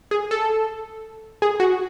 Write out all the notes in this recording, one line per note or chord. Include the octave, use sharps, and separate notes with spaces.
G#4
A4
G#4
F#4